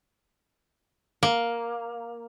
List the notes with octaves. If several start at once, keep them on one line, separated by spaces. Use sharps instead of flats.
A#3